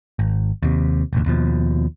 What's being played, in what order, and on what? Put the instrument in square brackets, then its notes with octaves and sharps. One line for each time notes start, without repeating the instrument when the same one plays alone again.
[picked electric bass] G#1
D#2 C3
E1 A1 D2
D#2 B2 F3